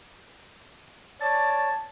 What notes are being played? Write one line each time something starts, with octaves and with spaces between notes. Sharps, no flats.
C#5 D5 A5 A6